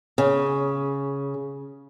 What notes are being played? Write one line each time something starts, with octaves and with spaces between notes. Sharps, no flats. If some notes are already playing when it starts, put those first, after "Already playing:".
C#3